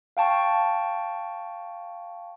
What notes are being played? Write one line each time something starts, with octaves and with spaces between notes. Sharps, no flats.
F5 G5 A5 C#6